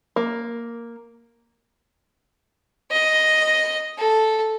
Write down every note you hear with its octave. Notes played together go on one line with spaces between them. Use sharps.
A#3
D#5
A4